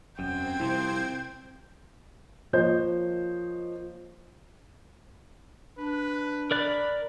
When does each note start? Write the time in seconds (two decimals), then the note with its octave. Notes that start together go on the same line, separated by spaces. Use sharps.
0.19 E1 F#2 C4 C5 G5 G#6
0.60 C2 F3 E4
2.53 F3 A#3 C5 C#5 D#5 G6
5.78 D4 B4
6.51 A#4 D5 B5 F#6